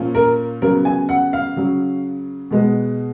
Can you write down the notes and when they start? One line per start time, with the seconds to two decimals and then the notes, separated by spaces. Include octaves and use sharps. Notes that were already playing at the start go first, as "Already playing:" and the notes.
Already playing: A#2 F3 A#3 C#4
0.15 A#4
0.62 C#3 F#3 B3 A#4
0.85 G#5
1.09 F#5
1.33 F5
1.56 C#3 F#3 C#4
2.51 B2 G#3 B3